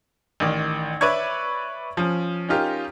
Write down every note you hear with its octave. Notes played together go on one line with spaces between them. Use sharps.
A1 D#3 D5
B4 C#5 D5 E5 C#6 G#6
F3 C#4
C#4 D#4 F4 G4 A#4